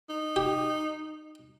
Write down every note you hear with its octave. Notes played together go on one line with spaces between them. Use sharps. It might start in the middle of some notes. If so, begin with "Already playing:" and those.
D#4
G4